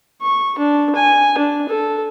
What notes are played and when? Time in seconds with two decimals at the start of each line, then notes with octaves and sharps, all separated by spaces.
0.21 C#6
0.58 D4
0.95 G#5
1.38 D4
1.69 A4